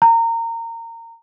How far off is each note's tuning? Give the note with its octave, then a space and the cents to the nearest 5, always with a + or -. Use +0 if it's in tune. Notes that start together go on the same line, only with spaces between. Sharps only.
A#5 -25